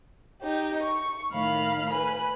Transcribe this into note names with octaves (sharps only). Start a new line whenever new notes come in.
D#4 G4
C#6
A2 D#3 F5 B5 F6
B4 G#5 B5